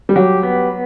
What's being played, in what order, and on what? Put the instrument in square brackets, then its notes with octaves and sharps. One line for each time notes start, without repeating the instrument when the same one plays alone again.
[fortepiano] G3
[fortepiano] F#3 [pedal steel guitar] G4
[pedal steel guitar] B3